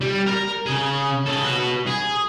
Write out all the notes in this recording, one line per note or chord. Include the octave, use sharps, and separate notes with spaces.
G3
A#4
C#3 G#4
C#3 A4
F#4 B4
G#4